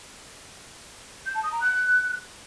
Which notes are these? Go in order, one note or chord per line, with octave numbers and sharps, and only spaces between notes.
G6
A5
D#6
A#5
F#6